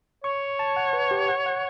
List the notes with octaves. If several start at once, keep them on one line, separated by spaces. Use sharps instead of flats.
C#5 C#6
A5
F#5
B4
G4
F#5
F#5